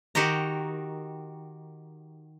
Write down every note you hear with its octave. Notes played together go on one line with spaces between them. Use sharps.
D#3 F#4 G4 D#5 A#5